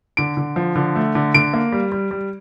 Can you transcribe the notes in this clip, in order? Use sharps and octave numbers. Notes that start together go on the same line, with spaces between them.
D3 D7
D3
F3
D3
A3
D3
D3 D7
A#3
G3
G3
G3